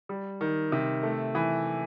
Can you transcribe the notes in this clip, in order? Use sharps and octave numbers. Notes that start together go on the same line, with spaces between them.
G3
D#3
C3
A3
E3